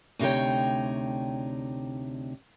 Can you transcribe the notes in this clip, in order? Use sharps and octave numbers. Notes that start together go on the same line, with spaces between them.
D2 C3 D#4 F4 C#5 G5